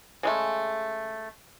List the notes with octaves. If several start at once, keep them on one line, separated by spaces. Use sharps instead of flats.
C#3 G#3 A3